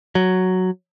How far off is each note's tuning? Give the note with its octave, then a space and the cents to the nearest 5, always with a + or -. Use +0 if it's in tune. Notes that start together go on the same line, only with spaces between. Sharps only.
F#3 +0